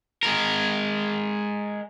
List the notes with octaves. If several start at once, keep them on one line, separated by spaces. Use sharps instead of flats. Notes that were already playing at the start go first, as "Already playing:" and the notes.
G#3 A#4